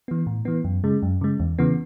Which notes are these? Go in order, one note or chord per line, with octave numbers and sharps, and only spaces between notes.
E3 B3
A2
E3 B3
F#2
C#3 G#3
F#2
C#3 G#3
E2
C#3 E3 B3